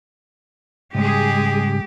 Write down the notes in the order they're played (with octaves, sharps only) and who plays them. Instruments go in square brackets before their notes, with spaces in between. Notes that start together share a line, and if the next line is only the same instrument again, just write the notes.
[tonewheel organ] G#2 C#3 G3 [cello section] G#3 G#4 [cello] G4